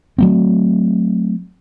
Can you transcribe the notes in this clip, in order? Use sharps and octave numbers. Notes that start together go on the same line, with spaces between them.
F#3 A3 C4